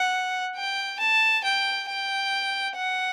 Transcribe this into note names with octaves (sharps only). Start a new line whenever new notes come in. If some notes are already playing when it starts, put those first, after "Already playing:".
Already playing: F#5
G5
A5
G5
G5
F#5